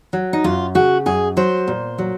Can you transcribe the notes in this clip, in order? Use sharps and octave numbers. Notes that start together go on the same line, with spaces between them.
F#3
D#4
F#2 F4
C#3 F#4
F#2 G#4
F#3 C5
A#2
F#3